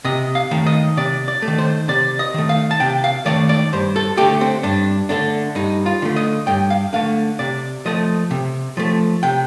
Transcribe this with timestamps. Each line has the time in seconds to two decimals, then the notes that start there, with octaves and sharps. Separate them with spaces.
0.04 C3 D#5
0.35 F5
0.51 D#3 A3
0.66 D#5
0.97 C3 D5
1.28 D5
1.42 A3
1.48 D#3
1.58 C5
1.88 C3 D5
2.19 D#5
2.34 D#3 A3
2.49 F5
2.71 A5
2.80 C3 G5
3.04 F5
3.26 D#3 A3 D5
3.49 D5
3.73 G2 C5
3.96 A4
4.17 D3 A3 G4
4.41 C4
4.63 G2 D4
5.09 D3 A3 D4
5.55 G2 D#4
5.86 F4
6.02 D3 A3
6.16 D#5
6.47 G2 G5
6.70 F5
6.93 D3 A3 F5
7.39 C3 D5
7.86 F3 A3 D#5
8.31 C3
8.77 F3 A3
9.23 C3 G5